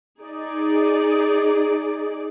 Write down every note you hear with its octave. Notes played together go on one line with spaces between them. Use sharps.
D#4 G#4 D5